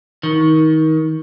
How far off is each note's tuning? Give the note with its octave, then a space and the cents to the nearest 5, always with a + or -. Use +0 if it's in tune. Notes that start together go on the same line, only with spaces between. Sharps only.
D#3 +25